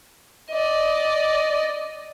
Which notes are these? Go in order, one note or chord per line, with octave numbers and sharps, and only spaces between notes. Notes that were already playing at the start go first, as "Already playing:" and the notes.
D5 D#5